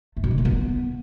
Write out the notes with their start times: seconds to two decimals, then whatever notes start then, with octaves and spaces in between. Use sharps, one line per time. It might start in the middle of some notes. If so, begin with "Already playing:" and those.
0.17 A3
0.24 B2
0.31 D3
0.38 A3
0.45 B3